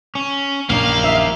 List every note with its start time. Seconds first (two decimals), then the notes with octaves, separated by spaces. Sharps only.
0.15 C#4
0.70 A#1 F#2 A#2 A#3 D#4 F5
1.04 E5